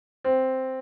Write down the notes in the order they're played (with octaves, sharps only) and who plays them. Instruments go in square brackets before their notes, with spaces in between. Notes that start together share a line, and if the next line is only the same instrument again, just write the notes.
[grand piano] C4